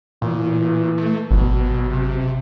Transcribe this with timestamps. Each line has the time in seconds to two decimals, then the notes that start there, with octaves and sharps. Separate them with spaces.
0.22 A#2 E3
0.98 A3
1.31 G#1 B2 F#3
1.90 C3